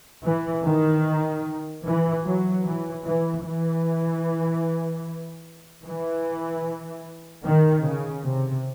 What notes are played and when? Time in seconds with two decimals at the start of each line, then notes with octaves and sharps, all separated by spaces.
0.25 E3
0.65 D#3
1.85 E3
2.25 F#3
2.65 E3
3.05 E3
3.45 E3
5.85 E3
7.45 D#3
7.85 C#3
8.25 C3